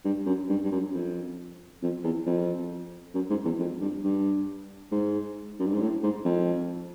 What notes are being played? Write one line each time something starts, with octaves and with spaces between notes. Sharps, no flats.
G2
F#2
G2
G2
F#2
F2
F2
E2
F2
F#2
G#2
E2
F2
G2
G2
G#2
F#2
G2
G#2
A2
G#2
F2